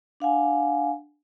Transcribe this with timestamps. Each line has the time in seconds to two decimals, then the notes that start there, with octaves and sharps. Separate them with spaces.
0.20 D4 F5 F#5 G#5